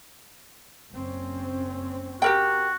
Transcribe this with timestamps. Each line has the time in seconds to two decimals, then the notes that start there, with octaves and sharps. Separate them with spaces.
0.92 F#1 C4 C#4
2.22 F#4 G4 A#4 G5